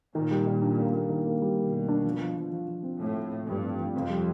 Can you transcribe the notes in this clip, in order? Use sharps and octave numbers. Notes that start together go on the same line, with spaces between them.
A#2 D#3
G3
D#3
D4
A#3
A#3
D#3
A#3
G3
B2 D#3
G3
D4
F3
F3
F3
F3
F3
C4
A2 A3
A3
A3
G2 F3
C4
F3
F2 C3
G3